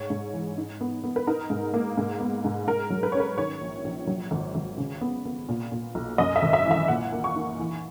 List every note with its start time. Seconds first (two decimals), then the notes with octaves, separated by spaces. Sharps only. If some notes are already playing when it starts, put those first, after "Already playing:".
Already playing: G#2 C#5
0.10 G#2
0.33 E3
0.58 D#4
0.81 B3
1.04 B3
1.16 B4
1.27 D#4 A#4
1.50 G#2
1.74 A#3
1.97 G#2
2.21 B3
2.44 G#2
2.67 G#2 A#4
2.90 F#3
3.03 B4
3.12 C#4 C#5
3.20 B4
3.38 D#3 C#5
3.61 A#1
3.84 A#1
4.07 F#3
4.31 G#1
4.55 G#1
4.78 C#3
5.01 B3
5.25 B3
5.49 A#2
5.72 A#2
5.95 B1
6.18 F#2 D#5
6.36 E5
6.42 G#1
6.53 E5
6.65 E3
6.71 E5
6.88 A#2 F#5
7.12 A#3
7.24 C#6
7.36 D#4
7.59 E3